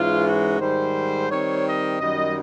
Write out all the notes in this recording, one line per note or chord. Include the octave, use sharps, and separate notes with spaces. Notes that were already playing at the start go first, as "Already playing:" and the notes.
Already playing: G#2 E3 G#3 C#4 F4
F#4
G#2 D#3 G3 C5
D#3 G3 C4 C#5
D#5
F#2 D#3 G3 D#5